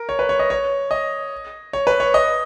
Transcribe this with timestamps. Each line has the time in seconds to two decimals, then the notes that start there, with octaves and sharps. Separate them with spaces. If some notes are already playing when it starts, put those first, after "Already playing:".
Already playing: A#4
0.09 C#5
0.19 B4
0.29 C#5
0.39 D#5
0.50 C#5
0.91 D#5
1.73 C#5
1.87 B4
2.00 C#5
2.14 D#5